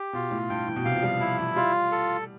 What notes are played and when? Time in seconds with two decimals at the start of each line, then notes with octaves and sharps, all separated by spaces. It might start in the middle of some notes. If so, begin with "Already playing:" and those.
Already playing: G4
0.13 B2 F4
0.31 A2
0.50 G2 G5
0.67 E3
0.76 B2
0.85 C3 F5
0.96 F3
1.03 G3
1.20 F3 E4
1.38 E3
1.56 G3 F4
1.92 A4